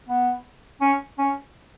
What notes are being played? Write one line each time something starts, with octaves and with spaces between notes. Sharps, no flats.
B3
C#4
C#4